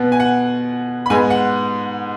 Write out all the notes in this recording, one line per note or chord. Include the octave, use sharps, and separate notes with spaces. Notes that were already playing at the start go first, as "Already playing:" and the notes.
Already playing: B2 B3
G#5
F#5
B5
G#2 G#3 B3 G#5
F#5